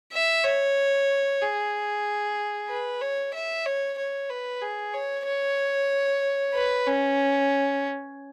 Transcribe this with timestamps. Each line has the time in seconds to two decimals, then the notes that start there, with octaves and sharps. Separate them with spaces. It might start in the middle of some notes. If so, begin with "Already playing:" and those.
0.13 E5
0.44 C#5
1.41 G#4
2.69 B4
3.02 C#5
3.34 E5
3.66 C#5
3.98 C#5
4.30 B4
4.62 G#4
4.94 C#5
5.25 C#5
6.55 B4
6.86 C#4